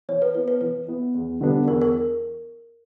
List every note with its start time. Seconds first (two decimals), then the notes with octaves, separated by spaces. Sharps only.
0.08 E3 C#5
0.22 B4
0.34 B3 E4 B4
0.48 B4
0.61 E3 B4
0.88 B3 E4
1.14 E2
1.41 D3 G3 B3 D4
1.68 E2 A#4
1.82 A#4